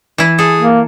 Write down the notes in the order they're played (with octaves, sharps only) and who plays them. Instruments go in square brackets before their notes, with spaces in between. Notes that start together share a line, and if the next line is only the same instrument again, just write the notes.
[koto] E3 E4
[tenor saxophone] G#4 [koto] A4
[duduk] A#3